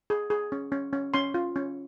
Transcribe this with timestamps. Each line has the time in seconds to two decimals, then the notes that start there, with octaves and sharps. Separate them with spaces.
0.10 G#4
0.30 G#4
0.52 C#4
0.72 C#4
0.93 C#4
1.14 C#4 C6
1.34 F4
1.56 C#4